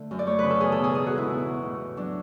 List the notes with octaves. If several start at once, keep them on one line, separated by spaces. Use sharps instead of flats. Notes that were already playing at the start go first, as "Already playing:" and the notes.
Already playing: D3 A3
F#2
D5
A3 C#5
C#3 B4
A4
E2 G#4
A4
B2 G#4
G#2 G#4
F#4
G#3
E4
B2
B2
A2
A2
F#3 D4